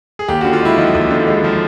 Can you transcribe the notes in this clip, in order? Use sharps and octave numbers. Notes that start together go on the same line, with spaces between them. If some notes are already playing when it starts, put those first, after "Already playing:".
G#4
D#2 G4
F#4
D3
F4
G#3 E4
F3 D#4
D#2
D3
G#3
F3